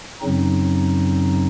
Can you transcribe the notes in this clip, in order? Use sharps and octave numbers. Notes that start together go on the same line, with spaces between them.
F#2 C#3 F#3 C4 D#4